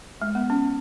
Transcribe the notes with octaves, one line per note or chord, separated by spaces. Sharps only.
G#3
B3
C#4